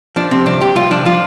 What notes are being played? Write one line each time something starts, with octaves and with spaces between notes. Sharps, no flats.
F3 D4
C3 C4
C2 D4
C2 G4
C2 F4
F3 D4
F3 F4